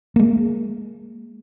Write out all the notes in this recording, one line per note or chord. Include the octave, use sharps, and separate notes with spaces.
G#3 A#3